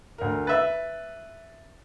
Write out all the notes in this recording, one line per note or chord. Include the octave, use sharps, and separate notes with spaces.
D2 A#4
B4 E5 A6